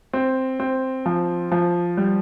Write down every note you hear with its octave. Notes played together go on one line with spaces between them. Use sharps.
C4
C4
F3
F3
G3